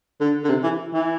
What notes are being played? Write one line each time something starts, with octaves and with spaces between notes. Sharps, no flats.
D3
D3
C3
E3
E3